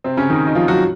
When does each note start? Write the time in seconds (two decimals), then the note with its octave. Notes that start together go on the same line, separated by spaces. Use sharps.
0.04 C3 C4
0.17 C#3 C#4
0.30 D#3 D#4
0.47 D#4
0.55 F3 F4
0.68 F#3 F#4